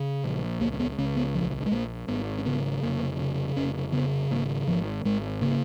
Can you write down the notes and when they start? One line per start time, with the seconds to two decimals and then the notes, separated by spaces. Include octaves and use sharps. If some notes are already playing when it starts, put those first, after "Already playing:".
Already playing: C#3
0.24 A#1
0.60 C#2 A#3
0.80 B3
0.98 C#2 C#4
1.16 B3
1.35 A#1 F3
1.66 G#3
1.71 A#1 A#3
2.08 G#1 B3
2.38 C#4
2.46 C#3 B3
2.82 F1 A#3
3.20 C#3
3.56 F1 C#4
3.93 C#3 B3
4.31 G#1 A#3
4.67 G#1 F3
5.05 G#1 G#3
5.42 C#3 A#3